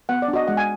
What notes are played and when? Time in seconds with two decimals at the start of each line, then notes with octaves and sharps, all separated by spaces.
0.09 B3 F#5
0.22 D5
0.28 D4
0.33 F#4 D#5
0.47 G#3 F#5
0.57 G#5